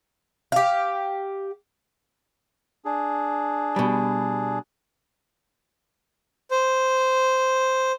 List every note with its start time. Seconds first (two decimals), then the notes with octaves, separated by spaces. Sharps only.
0.52 G4 F5
2.85 D4 G#4
3.76 B2 G3
6.51 C5